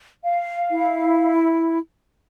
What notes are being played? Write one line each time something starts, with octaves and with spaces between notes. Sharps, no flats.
F5
E4